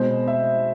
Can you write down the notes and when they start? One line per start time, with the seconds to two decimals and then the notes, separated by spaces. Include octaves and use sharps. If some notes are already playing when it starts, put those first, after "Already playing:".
Already playing: B2 G#3 C4 C5
0.28 E5